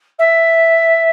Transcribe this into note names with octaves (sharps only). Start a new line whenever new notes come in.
E5